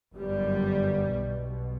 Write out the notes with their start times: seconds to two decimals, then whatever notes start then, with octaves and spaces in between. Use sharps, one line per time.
0.14 G1 F#2 G3
1.08 B1 B2